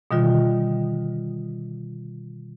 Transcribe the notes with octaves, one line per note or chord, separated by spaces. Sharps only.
B2 D3 D#3 G3 F4